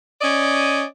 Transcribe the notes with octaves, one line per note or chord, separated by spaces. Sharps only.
C#4 D5 D#5